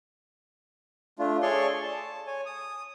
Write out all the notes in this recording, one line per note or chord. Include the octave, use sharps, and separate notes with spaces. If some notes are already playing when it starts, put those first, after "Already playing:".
A3 D4 F4
G#4 A4 C#5 D5 C6 C#6
A5
C#5 G#5
D#6